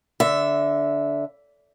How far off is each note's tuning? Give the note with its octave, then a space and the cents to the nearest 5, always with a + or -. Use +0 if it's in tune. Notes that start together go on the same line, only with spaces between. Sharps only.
D3 -15 E5 +0